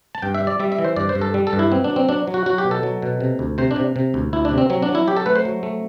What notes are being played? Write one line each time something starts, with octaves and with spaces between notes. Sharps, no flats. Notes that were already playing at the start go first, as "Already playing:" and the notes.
A5
G2 G5
E5
G3
D5
G3 E5
E5
E3
C5
G2 D5
C5
G2
A4
G3
A4
G2
E4
B3 C4
D4
F#3
C4
F#3 D4
F#3
F#4
F#3 F#4
G4
B2
A4
F#3
B2
C3
D2
C3 C5
D4
C3
C3
D2
D2 E4
D4
C3
C4
F#3 C4
D4
F#3
E4
F#3 G4
A4
A3 B4
C5
F#3
A3